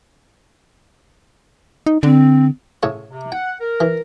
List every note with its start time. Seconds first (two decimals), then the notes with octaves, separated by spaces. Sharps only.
1.86 D#4
2.03 D3 C4
2.83 A2 C#3 C#5
3.10 C3
3.32 F#5 G5
3.60 A#4
3.80 E3